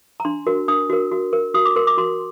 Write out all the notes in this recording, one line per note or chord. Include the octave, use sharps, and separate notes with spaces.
A#5
D4 C6
F#4 A#4
D4 D#6
F#4 A#4
F#4
A#4
F#4 D#6
D6
A#4 C6
D6
F#4 C6